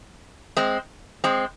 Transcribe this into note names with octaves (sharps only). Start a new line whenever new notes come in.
G#3 C4
G#3 C4